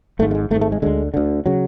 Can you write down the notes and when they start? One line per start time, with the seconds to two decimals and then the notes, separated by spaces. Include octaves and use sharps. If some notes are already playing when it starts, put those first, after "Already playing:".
0.19 G#1 A3
0.22 G#2
0.31 A3
0.35 G#3
0.51 G#1 A3
0.56 G#2
0.61 A3
0.72 G#3
0.82 D2 D3 G#3
1.14 D2 D3
1.46 C#3 F#3